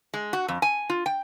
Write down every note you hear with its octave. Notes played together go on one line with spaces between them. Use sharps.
G#3
F#4
F2
G#5
F4
G5